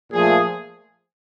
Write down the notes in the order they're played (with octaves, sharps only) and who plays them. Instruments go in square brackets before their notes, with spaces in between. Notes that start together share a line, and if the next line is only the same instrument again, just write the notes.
[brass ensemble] A#2 F3 A3 G#4